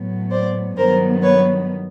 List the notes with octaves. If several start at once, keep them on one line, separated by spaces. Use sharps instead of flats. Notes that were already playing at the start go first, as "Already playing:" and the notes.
Already playing: A2 F#3 B3
C5 D5
G2 D#3 F#3 B3 A#4 C5
B4 C#5